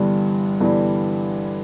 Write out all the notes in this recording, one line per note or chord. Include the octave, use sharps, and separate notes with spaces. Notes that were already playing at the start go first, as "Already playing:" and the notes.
Already playing: G1 G2 E3 G3
G1 G2 E3 G3